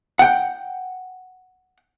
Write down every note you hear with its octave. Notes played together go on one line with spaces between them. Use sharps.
F#5 G5